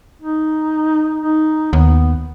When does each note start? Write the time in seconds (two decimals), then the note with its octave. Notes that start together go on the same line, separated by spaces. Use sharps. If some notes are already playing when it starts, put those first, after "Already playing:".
0.22 D#4
1.20 D#4
1.73 D#2 B3